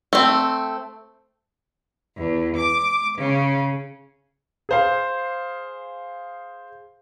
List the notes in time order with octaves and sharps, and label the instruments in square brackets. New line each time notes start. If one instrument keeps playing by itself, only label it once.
[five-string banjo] A3 C4
[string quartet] E2
D6
C#3
[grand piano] G#4 C5 F5